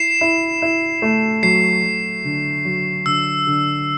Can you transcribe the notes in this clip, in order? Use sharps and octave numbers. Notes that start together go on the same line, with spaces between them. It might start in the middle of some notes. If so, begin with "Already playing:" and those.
Already playing: E4 C7 E7
E4
E4
A3
F#3 C7
F#3
D3
F#3
D3 E6
D3